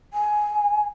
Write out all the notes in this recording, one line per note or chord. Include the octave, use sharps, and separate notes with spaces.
G#5